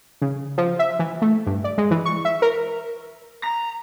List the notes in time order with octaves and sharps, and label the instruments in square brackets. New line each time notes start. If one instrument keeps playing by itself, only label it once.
[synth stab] C#3
F3
E5
E3
A3
G2
D5
G#3
E3
C#6
E5
A#4
[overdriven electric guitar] A#5